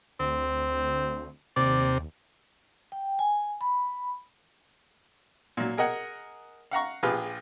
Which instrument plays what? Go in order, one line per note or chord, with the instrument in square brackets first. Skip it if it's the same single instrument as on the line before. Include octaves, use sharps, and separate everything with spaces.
[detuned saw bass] D2 [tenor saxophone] C4
[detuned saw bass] D#2 [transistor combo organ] C3 [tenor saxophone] D5
[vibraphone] G5
G#5
B5
[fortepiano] A#2 F#3
G#4 A#4 D#5 F#5 G#5
F5 F#5 A#5 C#6
A#1 F4 G4 G#4 B4 F6